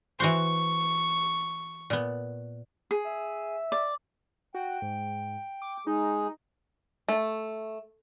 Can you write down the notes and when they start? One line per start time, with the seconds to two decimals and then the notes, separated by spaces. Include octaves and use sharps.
0.20 E3 F#4 C5 C#6
1.90 A#2 B3
2.91 G#4
3.05 E5
3.72 D5
4.54 F#4 G5
4.82 G#2
5.62 D6
5.87 G#3 D#4 G#4
7.08 A3